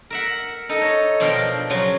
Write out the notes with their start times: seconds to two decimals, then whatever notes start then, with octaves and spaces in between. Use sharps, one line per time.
0.10 A#4 E5 F#5
0.69 D#4 A4 D#5
0.82 C#5
1.20 B2 F3 D4 A#4 F5 G5
1.70 C#3 F3 F#3